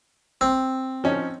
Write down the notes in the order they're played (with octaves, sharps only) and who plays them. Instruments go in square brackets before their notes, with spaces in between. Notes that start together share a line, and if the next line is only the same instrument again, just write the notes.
[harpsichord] C4
[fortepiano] F3 C#4 D#4